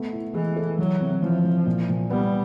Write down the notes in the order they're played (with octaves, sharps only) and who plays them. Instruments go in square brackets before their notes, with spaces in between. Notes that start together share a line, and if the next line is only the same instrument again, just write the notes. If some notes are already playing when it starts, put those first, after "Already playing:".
Already playing: [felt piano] A3 B3
E4
[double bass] E3 [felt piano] G#3
[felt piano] A4
[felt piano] E3 [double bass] F#3
[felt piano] C3
[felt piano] E3 [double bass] F3
[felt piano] E3
A#2
A#2
[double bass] G3 [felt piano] B3